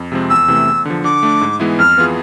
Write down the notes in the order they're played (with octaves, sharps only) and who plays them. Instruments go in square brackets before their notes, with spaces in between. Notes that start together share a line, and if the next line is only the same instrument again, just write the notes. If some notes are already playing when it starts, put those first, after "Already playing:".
Already playing: [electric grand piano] F2
C3 F3 G#3 C4
[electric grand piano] E2 [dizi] E6
[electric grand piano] C3 E3 A3
E2
D3 F3
[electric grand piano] D3 [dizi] D6
[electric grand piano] A3 D4
G#2
E3 G#3 B3 E4
[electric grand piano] F2 [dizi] F6
[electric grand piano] E3 B3 F4 G#4